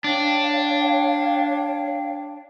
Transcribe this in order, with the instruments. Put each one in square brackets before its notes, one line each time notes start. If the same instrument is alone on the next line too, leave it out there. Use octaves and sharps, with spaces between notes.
[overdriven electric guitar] D4 [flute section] C#5 F5 G5